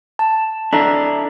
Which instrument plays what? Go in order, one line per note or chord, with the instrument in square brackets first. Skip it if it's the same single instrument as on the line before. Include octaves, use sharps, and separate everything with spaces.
[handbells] A5
[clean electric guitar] D4 E4 A4 [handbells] A#5